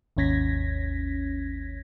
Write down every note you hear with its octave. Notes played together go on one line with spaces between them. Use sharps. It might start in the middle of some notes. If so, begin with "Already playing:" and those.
G#1 D#2 C#4 G#6 A#6 B6